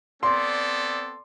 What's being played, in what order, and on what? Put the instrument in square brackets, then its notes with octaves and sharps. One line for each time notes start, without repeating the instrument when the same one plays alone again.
[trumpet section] B3 C4 A4 [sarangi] D5 [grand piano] C6